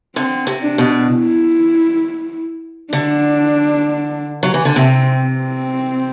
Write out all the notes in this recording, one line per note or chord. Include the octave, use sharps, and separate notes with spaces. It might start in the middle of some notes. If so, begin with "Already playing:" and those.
D3 C4
C3
D4
B2
E4
D3 D4
F#3
E3
D3
C3 C4
C4